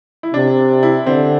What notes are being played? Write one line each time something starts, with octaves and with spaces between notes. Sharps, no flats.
E4
C3 D4
E4
D3 C4